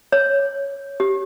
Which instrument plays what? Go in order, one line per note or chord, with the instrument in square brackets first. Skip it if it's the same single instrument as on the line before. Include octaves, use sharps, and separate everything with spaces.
[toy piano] C#5
G4